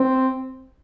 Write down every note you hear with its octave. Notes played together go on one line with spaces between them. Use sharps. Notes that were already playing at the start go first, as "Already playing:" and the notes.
Already playing: C4